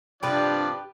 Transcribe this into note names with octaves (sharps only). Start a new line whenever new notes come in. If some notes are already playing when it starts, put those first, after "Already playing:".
G2 C3 F3 D4 G4 B4 D5